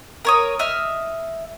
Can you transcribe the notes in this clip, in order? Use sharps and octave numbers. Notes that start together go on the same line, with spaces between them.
A#4 C#5 D#6
D#5 E5 F6